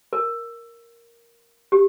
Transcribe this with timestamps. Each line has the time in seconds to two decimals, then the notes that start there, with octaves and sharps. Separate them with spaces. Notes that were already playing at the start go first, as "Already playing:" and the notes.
0.13 A#4
1.72 G4